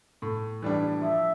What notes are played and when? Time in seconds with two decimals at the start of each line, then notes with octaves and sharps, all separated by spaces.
0.22 A2
0.62 E3 G3 D4
1.02 F3 E5